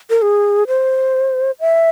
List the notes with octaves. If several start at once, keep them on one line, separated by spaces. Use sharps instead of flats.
A#4
G#4
C5
E5